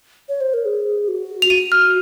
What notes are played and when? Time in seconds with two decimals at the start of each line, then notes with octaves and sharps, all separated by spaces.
0.29 C#5
0.41 C5
0.54 A#4
0.65 G#4
1.08 F#4
1.42 F7
1.50 F#4 D#7
1.72 F6